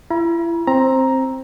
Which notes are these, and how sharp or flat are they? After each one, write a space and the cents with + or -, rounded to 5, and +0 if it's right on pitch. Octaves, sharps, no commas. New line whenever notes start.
E4 +35 A#5 +45
C4 +10 A#5 +5